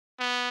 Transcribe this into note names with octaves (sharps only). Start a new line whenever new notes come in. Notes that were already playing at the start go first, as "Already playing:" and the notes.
B3